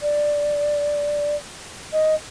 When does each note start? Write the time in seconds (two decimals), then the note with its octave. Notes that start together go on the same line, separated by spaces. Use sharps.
0.01 D5
1.92 D#5